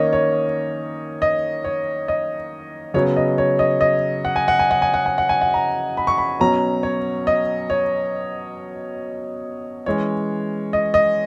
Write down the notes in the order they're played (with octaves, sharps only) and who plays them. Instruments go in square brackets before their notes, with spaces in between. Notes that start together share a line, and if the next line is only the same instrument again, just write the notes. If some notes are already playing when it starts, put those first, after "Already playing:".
Already playing: [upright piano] D#3 A#3 C#4 C#5 D#5
C#5
D#5
C#5
D#5
C#3 F#3 B3 C#5
D#5
C#5
D#5
D#5
F#5
G#5
F#5
G#5
F#5
G#5
F#5
G#5
F#5
G#5
F#5
A#5
B5
C#6
B5
B2 F#3 C#4 A#5
C#5
D#5
C#5
E3 G#3 C#4 C#5
D#5
D#5